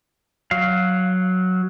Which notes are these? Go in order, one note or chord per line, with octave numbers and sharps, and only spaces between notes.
F#3 F5